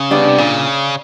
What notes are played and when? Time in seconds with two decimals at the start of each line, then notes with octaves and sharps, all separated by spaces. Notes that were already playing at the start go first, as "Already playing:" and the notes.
Already playing: C#3
0.11 G3 B3 D4
0.28 C3
0.38 A#2 C#3